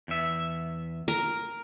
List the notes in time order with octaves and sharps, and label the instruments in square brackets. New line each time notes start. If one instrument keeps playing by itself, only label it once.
[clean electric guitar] E2 E5
[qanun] A#4